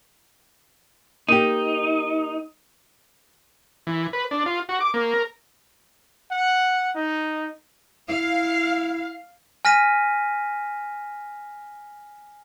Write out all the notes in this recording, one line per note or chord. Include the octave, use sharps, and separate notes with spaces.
A#3 D#4 G4
E3
B4
D4
F4
F#4
D6
A#3
A#4
F#5
D#4
E4 F5
G#5 F6 A#6 B6 D#7